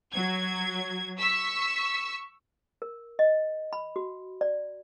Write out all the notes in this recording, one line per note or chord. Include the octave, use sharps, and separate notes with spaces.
F#3 G#6
C#6 E6 B6
A#4
D#5
B5
F#4
D5